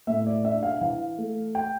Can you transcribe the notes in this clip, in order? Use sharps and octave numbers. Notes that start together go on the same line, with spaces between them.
A2 E5
D5
D4 E5
F5
E3 F5
A3
G5